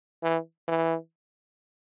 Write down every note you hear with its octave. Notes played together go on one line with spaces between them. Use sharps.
E3
E3